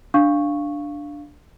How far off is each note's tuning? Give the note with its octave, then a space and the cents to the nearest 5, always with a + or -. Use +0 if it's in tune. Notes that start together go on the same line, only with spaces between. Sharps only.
D4 +0 F5 +0 C#6 -5